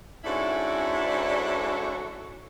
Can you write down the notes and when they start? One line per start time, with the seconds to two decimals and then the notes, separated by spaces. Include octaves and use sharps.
0.25 G#2 C#4 D4 E4 F#4 A4